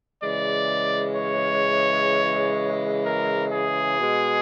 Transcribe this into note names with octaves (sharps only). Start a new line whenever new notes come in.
C#3 E3 G#3 D5
C#5
A#4
G#4
B2 G#3